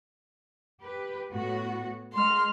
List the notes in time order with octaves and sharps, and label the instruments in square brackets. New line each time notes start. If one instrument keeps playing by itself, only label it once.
[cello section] G4 B4
A2 B3 F#4
[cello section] G#3 [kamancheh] C6 F6